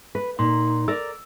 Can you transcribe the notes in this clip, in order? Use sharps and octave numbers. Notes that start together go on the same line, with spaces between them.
B4
A#2 D#4 C6
A#4 D5 E6